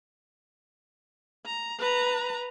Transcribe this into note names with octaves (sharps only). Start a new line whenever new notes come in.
A#5
B4 A#5